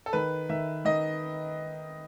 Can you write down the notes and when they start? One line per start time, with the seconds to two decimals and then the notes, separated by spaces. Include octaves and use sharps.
0.06 A4
0.13 D#3 B4
0.49 D#3 E5
0.85 D#3 D#5